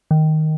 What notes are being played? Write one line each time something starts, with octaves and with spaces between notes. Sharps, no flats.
D#3